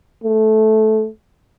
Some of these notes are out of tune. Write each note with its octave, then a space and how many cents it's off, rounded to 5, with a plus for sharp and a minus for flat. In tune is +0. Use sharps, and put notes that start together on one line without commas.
A3 -15